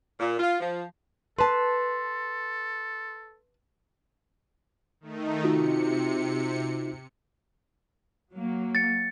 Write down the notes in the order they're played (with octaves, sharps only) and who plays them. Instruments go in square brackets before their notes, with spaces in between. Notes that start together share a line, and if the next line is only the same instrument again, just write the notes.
[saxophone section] A#2
F4
F3
[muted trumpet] A4 [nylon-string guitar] B4 A5 [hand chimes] C6 B6
[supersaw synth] D#3 A3 D#4
[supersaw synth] C3 C#7 [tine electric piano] D#4 F4 F#4
[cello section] F#3 A#3
[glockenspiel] A6 C#7